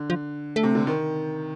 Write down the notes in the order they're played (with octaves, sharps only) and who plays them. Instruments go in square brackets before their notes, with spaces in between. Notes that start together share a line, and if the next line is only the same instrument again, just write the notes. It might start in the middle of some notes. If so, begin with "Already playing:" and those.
Already playing: [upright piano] D3
[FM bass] F3
A3
[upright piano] C3
D3
D#3